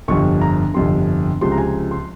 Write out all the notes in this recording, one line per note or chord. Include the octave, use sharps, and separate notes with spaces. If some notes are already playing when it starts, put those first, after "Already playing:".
G1 F2 C3 C#6
A#5
G1 F2 C3 C6
C#2 C3 F3 G#3 C6
A#5
G#5
C6